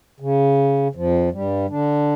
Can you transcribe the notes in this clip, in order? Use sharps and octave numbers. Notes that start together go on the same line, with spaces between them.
C#3
F2 F3
G2 G3
D3 D4